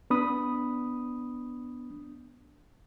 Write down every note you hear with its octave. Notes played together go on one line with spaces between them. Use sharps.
B3 D4 B5 D#6